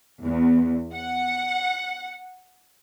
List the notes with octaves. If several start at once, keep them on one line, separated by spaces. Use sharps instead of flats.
E2
F#5